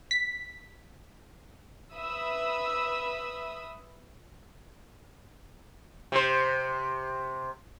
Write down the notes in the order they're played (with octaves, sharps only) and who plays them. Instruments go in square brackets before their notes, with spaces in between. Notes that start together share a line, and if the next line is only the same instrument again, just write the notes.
[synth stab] B6
[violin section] B4 E5 B5 D#6 E6
[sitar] C3 C5